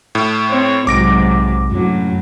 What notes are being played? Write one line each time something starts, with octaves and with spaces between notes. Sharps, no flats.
A2
C4 C#5
B1 G#2 C3 F#3 D6 A#6 D7
F#2 A2 F#3